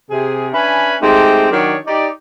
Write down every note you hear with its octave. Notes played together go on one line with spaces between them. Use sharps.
C3 G#4
C#4 D4 B4 E5 G#5 B5
G#3 A3 C4 D#4 G4
D#3 F#3 D4 A#4 C#5 D5
D#4 G4 D5